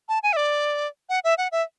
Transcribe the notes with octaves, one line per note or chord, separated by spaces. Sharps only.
A5
G#5
E5
D5
F#5
E5
F#5
E5